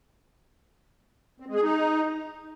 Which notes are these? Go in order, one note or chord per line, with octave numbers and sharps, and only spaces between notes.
C4
G#3
G#4
D#4